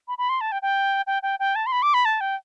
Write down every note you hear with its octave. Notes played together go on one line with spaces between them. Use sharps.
B5
B5
C6
A5
G5
G5
G5
G5
G5
A5
C6
B5
D6
B5
A5
G5